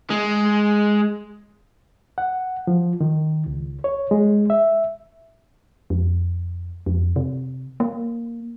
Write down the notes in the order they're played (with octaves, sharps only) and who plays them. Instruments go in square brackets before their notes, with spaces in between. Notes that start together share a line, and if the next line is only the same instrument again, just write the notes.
[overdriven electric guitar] G#3
[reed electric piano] F#5
F3
D#3
C#2
C#5
G#3
E5
[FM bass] F2
F2
C3
A#3